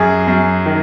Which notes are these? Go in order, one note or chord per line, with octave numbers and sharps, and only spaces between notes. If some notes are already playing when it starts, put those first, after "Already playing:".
Already playing: F#2 G#4
F#2
D#3